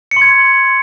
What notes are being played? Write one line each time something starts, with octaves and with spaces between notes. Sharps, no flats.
C#7
C6
G#6